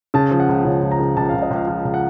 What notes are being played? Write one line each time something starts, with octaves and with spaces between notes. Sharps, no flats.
C#3 A5
F3
F#5
C#2
C#3
C#2
A#5
C#3
C#2 A5
F5
C#2
D#5
C#2
F5
F3 F5
C#2
F#5